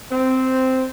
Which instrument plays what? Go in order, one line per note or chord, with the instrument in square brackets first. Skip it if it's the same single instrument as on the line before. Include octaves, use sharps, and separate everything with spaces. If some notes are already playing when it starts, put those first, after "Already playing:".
[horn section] C4